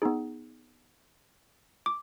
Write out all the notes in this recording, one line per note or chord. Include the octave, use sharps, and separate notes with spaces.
B3 D#4 G#4
D6